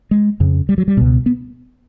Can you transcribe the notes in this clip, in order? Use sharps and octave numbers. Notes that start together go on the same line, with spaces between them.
G#3
F2 C#3
G3
F#3
G3
C#2 B2
B3